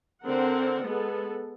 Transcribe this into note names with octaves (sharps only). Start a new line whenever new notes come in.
D3 C4 A#4 F#5
G#3 B3 A4